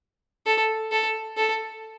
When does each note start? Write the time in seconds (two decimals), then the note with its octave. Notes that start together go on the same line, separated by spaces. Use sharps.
0.46 A4
0.92 A4
1.37 A4